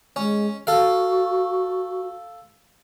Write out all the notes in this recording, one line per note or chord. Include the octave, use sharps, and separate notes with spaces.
G#3 C#4
F#4 A4 F5